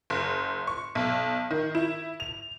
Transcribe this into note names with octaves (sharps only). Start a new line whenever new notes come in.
F#1
C#6
B1
D#3
E4
F7